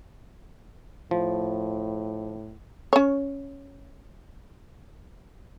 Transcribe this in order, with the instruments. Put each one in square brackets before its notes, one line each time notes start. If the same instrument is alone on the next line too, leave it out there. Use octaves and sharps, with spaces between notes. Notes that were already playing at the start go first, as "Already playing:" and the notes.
[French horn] A2 [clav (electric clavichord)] F3
[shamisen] C#4 C#5